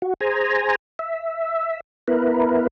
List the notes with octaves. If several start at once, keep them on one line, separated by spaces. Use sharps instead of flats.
F#4
G#4 C5 G#5 A#5
E5
B3 E4 A#4 B4